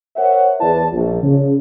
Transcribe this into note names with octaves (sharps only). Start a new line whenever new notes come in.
A#4 C5 C#5 E5 F#5
E2 E4 G#4 B4 D5 A5
A#1
C#3